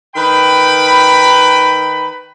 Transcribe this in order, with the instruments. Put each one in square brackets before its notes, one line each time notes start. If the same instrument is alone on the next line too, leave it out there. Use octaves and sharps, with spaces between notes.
[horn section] D#3 B4 G5 B5